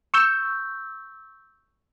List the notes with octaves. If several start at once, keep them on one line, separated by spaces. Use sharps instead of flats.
C#6 E6 G6